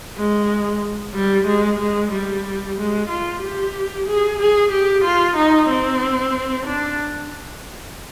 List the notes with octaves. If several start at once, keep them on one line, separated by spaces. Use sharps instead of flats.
G#3
G3
G#3
G#3
G3
G#3
F4
G4
G#4
G#4
G4
F4
D#4
C4
D4